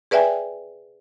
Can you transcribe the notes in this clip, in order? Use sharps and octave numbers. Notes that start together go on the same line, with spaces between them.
G#4 B4 D5 E5 G5 G#5